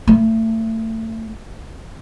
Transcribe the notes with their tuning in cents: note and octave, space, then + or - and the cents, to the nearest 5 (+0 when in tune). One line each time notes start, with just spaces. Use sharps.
A3 +25